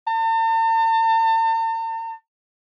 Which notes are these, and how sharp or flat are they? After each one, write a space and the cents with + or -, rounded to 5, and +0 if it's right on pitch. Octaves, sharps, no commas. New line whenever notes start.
A5 +45